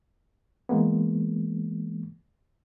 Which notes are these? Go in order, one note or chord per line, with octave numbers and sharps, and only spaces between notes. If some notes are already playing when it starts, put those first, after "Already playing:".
E3 G#3 A#3 B3